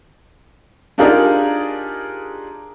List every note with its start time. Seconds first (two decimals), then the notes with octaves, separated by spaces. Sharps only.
0.98 D4 D#4 F4 G4 G#4 A#4